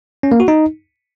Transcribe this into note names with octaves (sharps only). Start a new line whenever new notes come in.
C#4
A#3
F#4
D#4